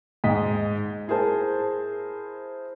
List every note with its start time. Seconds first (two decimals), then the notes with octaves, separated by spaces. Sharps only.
0.24 G#2 D#5 B6
1.08 E4 G#4 A#4 C5 A5